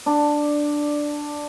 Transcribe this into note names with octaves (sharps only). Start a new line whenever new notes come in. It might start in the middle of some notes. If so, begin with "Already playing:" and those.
D4 D5